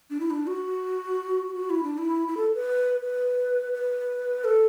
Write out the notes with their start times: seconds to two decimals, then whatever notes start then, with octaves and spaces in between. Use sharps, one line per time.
0.10 D4
0.20 E4
0.30 D4
0.47 F#4
1.55 F#4
1.70 E4
1.83 D4
1.98 E4
2.28 E4
2.37 A4
2.55 B4
3.01 B4
3.73 B4
4.44 A4